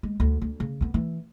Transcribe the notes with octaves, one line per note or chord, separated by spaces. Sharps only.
G#3
D2
D2
C#3
D3 B3
E3